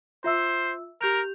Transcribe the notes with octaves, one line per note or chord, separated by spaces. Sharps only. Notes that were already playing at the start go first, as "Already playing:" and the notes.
F4 C5 E5 E6
G4 A#4 G6 F7